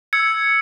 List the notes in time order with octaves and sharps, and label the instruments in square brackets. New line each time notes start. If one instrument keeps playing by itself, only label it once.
[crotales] E6 G#6 C#7